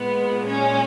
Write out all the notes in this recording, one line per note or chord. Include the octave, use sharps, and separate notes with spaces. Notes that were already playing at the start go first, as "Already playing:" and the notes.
Already playing: A#2 G#3 B3
C#4